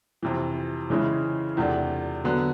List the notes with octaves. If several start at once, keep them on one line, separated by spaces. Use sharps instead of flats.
F2 C3 E3
C#3 E3 G#3 C#4 E4
E2 C3 F3 A3 D4
D3 F#3 B3